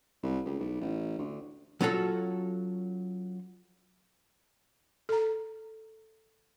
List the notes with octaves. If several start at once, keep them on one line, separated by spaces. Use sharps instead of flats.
C2
C#2
B1
A1
D2
F#3 C#4 F4 F#4 A4
A4 A#5